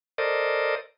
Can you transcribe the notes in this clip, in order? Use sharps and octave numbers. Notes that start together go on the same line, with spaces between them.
A4 A#4 C5 D5 D#5